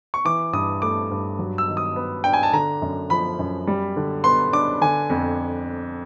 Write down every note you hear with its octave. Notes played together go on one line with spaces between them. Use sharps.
C#6
E3 D6
G2 D#6
A3 D6
G2
F#3
E6
D#3
D#6
B3
D4 G5
G#5
A5
D3 A#5
F#2
F3 B5
F#2
G3
D3
B3 C6
D4 D6
D3 G#5
F2